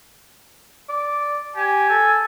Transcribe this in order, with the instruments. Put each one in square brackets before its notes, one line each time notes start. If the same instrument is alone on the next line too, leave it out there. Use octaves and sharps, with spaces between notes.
[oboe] D5
[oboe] G4 [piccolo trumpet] G#5
[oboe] A4